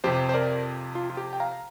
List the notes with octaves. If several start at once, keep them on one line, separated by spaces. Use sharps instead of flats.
F2 C3 G4 C5
C5
A#4 D5
F4
F4
G4
G5
F5 A#5